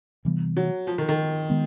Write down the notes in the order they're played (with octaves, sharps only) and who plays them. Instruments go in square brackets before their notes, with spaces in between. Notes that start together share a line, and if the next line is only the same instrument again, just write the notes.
[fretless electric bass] C3 E3 G3 B3
[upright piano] F#3
F3
D#3
D#3
[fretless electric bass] D#3 G#3 B3